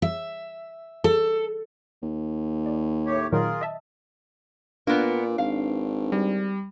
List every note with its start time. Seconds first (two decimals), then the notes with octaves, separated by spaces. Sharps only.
0.02 E5
1.04 A4
2.02 D#2
2.66 D5
3.07 A2 G4 C#5
3.32 A#2 D#3 F#3 F4 G#4 A#4
3.61 D#5 E5 A5
4.87 A#2 A#3 B3 D4 B4 D5
5.38 G#1 F5
6.12 G3